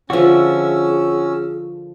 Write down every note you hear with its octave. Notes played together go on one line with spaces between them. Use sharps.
D3 F3 C#4 F#4 G#4 E5 E6